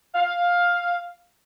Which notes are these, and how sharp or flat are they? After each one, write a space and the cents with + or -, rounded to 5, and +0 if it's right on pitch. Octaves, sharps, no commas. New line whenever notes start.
F5 +10